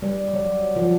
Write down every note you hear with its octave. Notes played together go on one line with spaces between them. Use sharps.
G3
F#3
F3